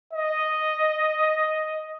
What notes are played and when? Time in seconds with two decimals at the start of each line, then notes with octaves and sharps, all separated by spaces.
0.13 D#5